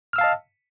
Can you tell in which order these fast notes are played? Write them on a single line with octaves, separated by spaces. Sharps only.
F6 E6 F5 A5 D#5